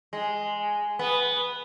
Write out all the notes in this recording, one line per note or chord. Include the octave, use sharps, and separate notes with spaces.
G#3
B3